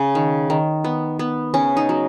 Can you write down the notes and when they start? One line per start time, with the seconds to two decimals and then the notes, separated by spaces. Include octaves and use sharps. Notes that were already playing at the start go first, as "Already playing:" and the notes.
Already playing: C#3
0.15 D#3
0.50 D#3
0.84 B3
1.19 B3
1.54 C#3 C#4
1.77 D#4
1.89 F#3